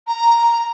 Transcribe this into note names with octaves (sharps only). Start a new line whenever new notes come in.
A#5